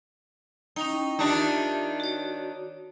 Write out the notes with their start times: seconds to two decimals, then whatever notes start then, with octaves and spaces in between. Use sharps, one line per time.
0.76 C#4 D#4 E4 G5
1.19 D#3 D4 D#4 F4 G4 E5
2.00 F#4 C#5